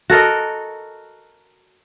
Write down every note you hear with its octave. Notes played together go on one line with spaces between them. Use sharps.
F#4 A4 A#4 D#5